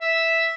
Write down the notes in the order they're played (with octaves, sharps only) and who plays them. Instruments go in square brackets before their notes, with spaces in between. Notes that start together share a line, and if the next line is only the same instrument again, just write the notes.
[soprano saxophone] E5